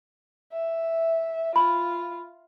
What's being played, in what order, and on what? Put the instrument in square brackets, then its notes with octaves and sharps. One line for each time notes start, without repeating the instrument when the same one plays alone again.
[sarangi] E5
[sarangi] F4 [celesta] B5